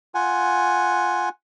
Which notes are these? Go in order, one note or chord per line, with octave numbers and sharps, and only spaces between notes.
F4 F#5 G#5